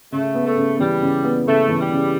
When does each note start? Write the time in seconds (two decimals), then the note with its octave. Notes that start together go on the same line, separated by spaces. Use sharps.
0.12 C#3 A3
0.35 B3
0.46 A3
0.57 C#3
0.79 E3 G3
1.02 C#3
1.24 B3
1.46 C#3 A3
1.68 E3
1.79 G3
1.91 C#3